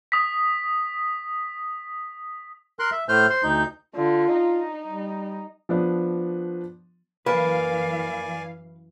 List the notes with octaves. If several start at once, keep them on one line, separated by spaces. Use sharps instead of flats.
D#6 B6
A#4 C6 F#6
E5
A2 A3 C5 F6 G6
C5 C6
D2 D#4 G6
D3 F4
D#4
G3
F3 B3 D4
F#2 E3 A#3 B4 D5 F5 G#5